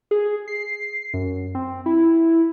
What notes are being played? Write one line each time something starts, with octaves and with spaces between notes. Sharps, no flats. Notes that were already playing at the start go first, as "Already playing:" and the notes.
G#4
C7
F#2
C4
E4